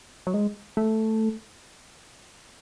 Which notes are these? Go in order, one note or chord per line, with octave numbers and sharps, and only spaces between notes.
F#3
G#3
A3